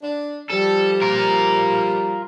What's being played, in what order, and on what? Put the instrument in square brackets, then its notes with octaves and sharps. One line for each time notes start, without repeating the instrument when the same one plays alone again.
[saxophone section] D4
[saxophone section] F3 G3 [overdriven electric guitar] A4
[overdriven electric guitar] F4 A#4